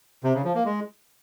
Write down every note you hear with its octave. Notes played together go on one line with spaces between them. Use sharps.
C3
C#3
F3
A#3
G#3